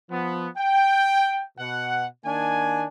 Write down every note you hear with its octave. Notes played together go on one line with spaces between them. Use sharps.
F3 B3
G5
B2 F#5
D#3 A#3 D4 G#5